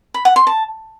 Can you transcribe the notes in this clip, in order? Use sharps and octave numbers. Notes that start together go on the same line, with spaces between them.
B5
F#5
C6
A5